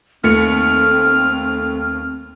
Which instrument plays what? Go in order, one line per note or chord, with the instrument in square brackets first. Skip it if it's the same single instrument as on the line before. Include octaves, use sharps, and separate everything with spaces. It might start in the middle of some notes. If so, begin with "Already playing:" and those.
[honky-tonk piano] D#2 A3 C#7 [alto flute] C4 [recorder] F6